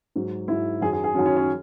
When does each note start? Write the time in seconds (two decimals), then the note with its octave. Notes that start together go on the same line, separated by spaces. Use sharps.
0.16 G#2 F#3
0.48 G#2 F#3 E4
0.81 F#2 D#3 F#3 G#4
0.93 G#4
1.04 G#4
1.15 F#2 D#3 F#3 C#4
1.26 C#4
1.37 C#4